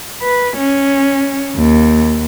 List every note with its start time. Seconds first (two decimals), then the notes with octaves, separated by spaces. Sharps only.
0.22 B4
0.58 C#4
1.56 D#2